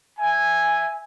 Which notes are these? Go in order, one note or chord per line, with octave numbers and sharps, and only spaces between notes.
E5 G#5